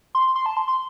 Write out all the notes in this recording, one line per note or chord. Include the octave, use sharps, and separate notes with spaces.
C6
C6
A5
C6
C6